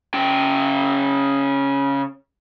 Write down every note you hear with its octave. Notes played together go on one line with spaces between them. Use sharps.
C#3 G5